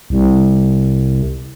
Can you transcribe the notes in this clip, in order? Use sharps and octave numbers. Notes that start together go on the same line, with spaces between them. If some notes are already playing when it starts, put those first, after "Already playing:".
C2